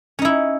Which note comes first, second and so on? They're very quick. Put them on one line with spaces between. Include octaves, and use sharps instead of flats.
C#4 D#4 E4